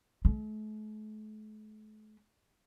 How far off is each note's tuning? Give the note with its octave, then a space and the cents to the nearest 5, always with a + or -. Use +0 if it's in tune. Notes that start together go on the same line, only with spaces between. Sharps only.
A3 -45